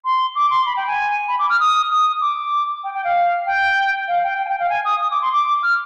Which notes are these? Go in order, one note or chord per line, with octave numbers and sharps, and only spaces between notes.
C6
D6
C6
B5
G5
G#5
B5
D6
F6
D#6
D#6
D6
G5
G5
F5
G5
F5
G5
G5
G#5
G5
F5
G#5
D#6
D#6
D6
C6
D6
F6